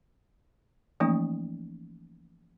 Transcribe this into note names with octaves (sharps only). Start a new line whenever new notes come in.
E3 F3 A3 A#3 C#4 D#4